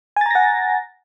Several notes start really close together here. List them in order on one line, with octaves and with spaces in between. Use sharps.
G#5 A6 A#5 A#6 F#5